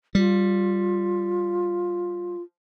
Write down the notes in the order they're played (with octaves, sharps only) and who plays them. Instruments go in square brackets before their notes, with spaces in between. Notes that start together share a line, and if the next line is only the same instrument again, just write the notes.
[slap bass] G3 [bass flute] F4